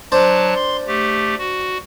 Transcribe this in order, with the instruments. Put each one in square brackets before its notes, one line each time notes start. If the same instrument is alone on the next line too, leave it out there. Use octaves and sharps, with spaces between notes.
[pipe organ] F#3 A5 [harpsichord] D4 C5
[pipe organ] C6
A3 G4
F#4